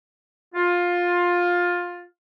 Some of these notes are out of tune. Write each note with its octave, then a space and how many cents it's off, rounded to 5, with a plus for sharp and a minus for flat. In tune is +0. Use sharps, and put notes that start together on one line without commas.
F4 +15